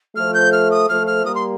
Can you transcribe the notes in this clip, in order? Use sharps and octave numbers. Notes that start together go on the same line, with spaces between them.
F3 A3 F6
G6
F6
D#6
F3 A3 F6
F6
G3 A#3 D#6
C6